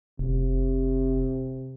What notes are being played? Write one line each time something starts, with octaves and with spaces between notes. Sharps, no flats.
F1 C3